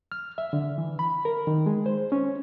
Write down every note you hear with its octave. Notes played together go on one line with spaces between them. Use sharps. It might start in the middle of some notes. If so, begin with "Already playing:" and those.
F6
E5
D3
E3
B5
A#4
D#3
G#3
C5
C#4